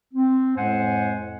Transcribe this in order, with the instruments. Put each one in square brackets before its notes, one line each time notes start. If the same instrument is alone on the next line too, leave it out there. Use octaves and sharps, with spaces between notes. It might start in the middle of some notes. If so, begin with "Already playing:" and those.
[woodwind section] C4
F2 A2 G#3 C5 F#5 G#5